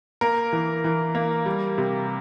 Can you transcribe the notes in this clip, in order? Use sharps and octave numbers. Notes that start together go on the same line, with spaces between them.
A#3 A#4
E3
E3
A#3
G3
C3